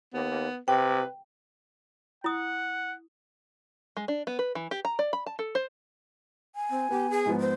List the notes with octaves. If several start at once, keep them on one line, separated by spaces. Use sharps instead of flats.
D#2 B3
C3 B4 G5
E4 F#5 D#6
G#3
D4
B3
B4
E3
G4
A#5
D5
B5
A5
A4
C5
G#5
C4
B3 G4
G#4
G#2 F3 B3
C5